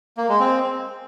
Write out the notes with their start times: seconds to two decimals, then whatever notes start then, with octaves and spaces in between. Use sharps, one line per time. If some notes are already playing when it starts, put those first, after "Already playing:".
0.18 A#3
0.29 G#3
0.40 C4